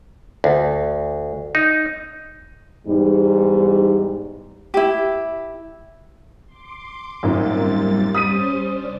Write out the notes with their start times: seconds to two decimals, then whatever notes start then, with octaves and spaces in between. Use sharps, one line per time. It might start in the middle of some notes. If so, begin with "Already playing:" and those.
0.44 D2
1.55 D#4
2.87 E2 G#2 G3 D#4
4.74 E4 G4
6.46 C6 D6
7.23 G#1 F#2 A#2 G3 A6
8.15 G3 C#4 C5 D#6 B6 D#7
8.66 C3 D4 D5